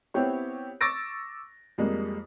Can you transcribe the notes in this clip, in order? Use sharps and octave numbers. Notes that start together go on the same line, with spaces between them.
B3 C4 E4 G4 C#5
C#6 D6 E6 A6 A#6 D7
F2 G3 G#3 A#3